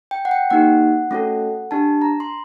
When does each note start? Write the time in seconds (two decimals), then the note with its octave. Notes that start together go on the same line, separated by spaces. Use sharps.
0.11 G5
0.25 F#5
0.31 G5
0.50 A#3 D#4 G4 F#5
1.11 A3 C#4 F#4 A4
1.71 D4 G4 A5
2.02 A#5
2.20 C6